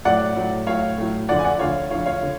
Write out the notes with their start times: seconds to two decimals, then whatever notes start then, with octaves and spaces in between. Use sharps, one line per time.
0.05 A2 F#3 D5 F#5
0.36 A2 F#3
0.67 A2 F#3 C#5 F5
0.98 A2 F#3
1.29 D2 D3 F3 D5 F#5
1.39 G#5
1.45 D5 F#5
1.59 D2 D3 F3 C#5 F5
1.90 D2 D3 F3 C#5 F5
2.05 C#5 F5
2.23 D3